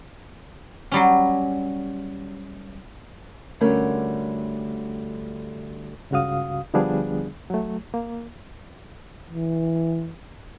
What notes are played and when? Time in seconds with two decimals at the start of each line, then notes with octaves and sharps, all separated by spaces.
0.92 F#3 G3 C#4
3.61 D2 D3 G3 A3 C#4 A#4
6.11 C#2 G2 C#3 F#4 F5 D#6
6.74 D3 F3 G3 B3 D4 G#4
7.50 F#3 A3
7.94 A#3
9.29 E3